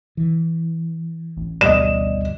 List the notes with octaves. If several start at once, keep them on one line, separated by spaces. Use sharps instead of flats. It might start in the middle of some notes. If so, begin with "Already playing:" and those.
E3
A1
D2 G2 B2 D5 D#5 E7